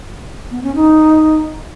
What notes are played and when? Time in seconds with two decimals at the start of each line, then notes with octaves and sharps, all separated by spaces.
0.51 B3
0.63 C#4
0.75 D#4